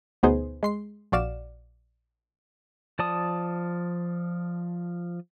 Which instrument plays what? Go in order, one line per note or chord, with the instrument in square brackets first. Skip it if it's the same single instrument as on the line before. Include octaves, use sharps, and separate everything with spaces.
[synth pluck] D2 B2 B3 D#4 G#4 C5
G#3 C6 C7
A#1 F#4 D5 F5 E7
[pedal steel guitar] F3 D5 A5 D#6